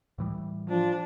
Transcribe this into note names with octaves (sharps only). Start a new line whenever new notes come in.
A2 E3 G3
F3 D4